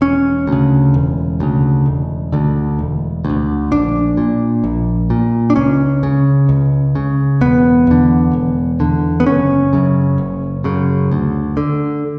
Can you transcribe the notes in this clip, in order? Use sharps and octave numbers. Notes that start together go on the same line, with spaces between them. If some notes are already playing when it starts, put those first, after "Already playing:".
E1 C#4
D2 C#3
E1
D2 C#3
E1
D2 D3
E1
D2
D3
A#1 D4
A#2
A#1
A#2
D4
C#2 C#4
C#3
C#2
C#3
E1 B3
E2 D3
E1
E2 D3
B3
F#1 C#4
F#2 C#3
F#1
F#2 C#3
D2
D3